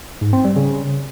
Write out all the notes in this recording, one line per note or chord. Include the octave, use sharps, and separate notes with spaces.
G#2
C4
G3
C#3